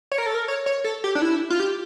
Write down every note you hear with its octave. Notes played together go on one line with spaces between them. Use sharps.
C#5
A#4
A4
A#4
C#5
C#5
A4
G4
D4
E4
F4
G4